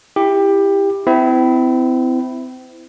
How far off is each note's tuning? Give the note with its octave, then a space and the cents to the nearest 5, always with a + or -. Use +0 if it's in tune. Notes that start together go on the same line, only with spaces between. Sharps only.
E4 +0 G4 +15
C4 -35 E4 +0